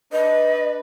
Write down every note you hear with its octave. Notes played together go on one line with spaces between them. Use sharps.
D4 B4 D#5